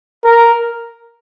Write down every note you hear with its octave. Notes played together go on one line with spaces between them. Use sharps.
A#4